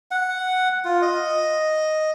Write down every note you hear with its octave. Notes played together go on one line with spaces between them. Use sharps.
F#5
F4
D#5